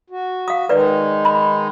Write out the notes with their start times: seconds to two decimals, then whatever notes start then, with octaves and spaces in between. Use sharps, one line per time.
0.10 F#4
0.48 F5 D#6
0.69 D#3 G#3 D#4 B4 D5
1.25 B5